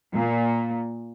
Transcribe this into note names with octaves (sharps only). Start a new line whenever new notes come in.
A#2